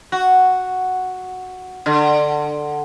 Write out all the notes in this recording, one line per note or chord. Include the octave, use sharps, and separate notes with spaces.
F#4
D3